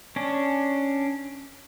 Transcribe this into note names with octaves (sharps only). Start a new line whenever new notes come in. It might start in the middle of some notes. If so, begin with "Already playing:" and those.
C#4 D4